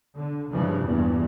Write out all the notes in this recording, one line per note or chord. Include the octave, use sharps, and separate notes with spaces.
D3
G2 C#3 E3 F3
E2 G2 A#2 E3